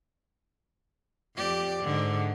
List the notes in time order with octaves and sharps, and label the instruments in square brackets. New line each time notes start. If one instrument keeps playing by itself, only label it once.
[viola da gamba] F2 G4 D5
G#2 D3